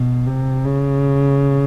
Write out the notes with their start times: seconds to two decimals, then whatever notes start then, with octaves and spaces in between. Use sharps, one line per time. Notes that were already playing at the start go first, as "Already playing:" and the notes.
Already playing: B2
0.27 C3
0.65 C#3